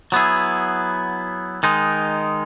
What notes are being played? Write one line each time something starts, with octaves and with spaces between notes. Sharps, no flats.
F#3 B3 E4 G#4
D#3 G#3 D#4